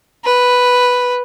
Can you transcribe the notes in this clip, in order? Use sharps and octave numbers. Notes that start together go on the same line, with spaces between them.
B4